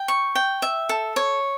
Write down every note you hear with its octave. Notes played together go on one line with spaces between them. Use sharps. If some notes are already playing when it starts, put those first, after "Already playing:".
Already playing: G5
C#6
G5
E5
A4
C#5